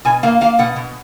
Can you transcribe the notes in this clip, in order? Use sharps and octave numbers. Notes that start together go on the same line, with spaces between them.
B2 G#5
A#3 F5
A#3 F5
B2 F#5
B2